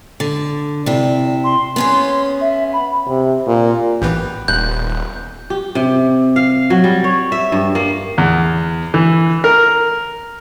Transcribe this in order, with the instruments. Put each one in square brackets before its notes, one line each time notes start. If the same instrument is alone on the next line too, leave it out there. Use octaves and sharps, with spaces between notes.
[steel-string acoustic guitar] D3
[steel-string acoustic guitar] C3 E4 [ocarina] D5
[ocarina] C6
[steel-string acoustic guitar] B3 C#4 G#4
[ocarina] E5
B5
[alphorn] C3
A#2
[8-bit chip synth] A#1 A2 E3 [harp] B3 G4
[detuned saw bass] D#1 [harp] F#6 [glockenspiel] G6
[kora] G4
C3
F5
F#3
G3
C#5
E5
G2
A#3
[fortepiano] E2
E3
A#4